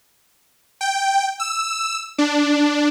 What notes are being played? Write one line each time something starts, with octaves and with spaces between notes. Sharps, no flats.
G5
E6
D4